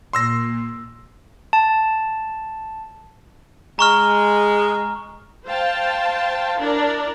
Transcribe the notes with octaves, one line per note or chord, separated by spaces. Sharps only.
A#2 C6 E6 A#6
A5
G#3 A#5 C#6 F6
C5 F5 G5 A5 C6
D4 E4 A#4 D5